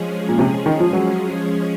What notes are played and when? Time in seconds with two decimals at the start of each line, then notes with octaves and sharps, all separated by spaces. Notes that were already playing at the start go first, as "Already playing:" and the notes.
Already playing: F3 G#3 C#4 G#4
0.29 A#2
0.39 C3
0.66 D#3
0.80 F3
0.93 F#3